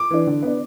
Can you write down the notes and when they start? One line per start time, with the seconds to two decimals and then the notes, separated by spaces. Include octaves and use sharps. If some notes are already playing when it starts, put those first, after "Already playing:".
Already playing: D6
0.11 E3 D4
0.27 D3
0.43 B3 D4